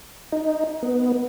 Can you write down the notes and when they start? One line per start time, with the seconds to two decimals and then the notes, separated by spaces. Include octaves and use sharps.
0.32 D#4
0.83 B3